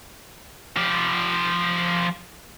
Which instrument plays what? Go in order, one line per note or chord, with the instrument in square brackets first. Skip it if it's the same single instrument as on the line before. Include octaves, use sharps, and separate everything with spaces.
[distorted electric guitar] F3 G4